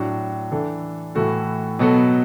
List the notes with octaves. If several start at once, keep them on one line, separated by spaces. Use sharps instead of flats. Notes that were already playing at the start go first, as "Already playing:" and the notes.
Already playing: A2 F#3 D4 F#4
E3 D4 A4
A2 E3 A3 F#4 A4
B2 F#3 B3 F#4 A4